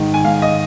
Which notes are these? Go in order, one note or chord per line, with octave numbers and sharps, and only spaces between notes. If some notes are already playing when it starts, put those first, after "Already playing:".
Already playing: G#2 D#3
G#5
G#2 F5
D#5